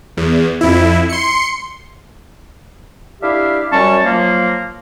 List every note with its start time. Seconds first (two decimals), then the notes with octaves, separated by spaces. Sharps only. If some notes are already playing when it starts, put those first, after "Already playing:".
0.17 E2
0.61 F2 E4
1.09 C6 C#7
3.22 D4 E4 G4 E5 F5
3.71 F#2 G3 C#4 A5 C#6
4.04 F3 F#3 A#3